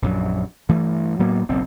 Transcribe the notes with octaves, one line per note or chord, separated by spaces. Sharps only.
A#1 F#2 F#3
G2 E3 A3
A2 F#3 A#3 B3
F#1 B1 C4